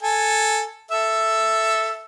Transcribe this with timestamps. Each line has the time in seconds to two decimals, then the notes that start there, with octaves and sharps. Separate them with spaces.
0.03 A4 G#5
0.91 A4 E5